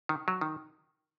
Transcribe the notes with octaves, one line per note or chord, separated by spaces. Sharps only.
D#3
F#3
D#3